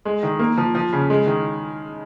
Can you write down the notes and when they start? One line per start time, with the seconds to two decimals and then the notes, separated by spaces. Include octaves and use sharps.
0.05 G#3
0.23 D#3
0.39 A#3
0.58 F3
0.75 F3
0.93 C#3
1.10 G#3
1.27 D#3